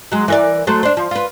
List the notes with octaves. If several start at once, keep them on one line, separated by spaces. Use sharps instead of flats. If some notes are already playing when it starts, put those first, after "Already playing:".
F#3 G#3
E3 A#4 D5
F#3 A3 C5
D4 C5
F3
F4 B4